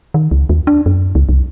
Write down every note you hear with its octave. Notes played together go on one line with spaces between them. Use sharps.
D#3
C#2
D#2
D4
F#2
C#2
C2